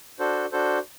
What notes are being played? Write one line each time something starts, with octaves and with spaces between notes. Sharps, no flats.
D4 F#4 A4 C5
D4 F#4 A4 C5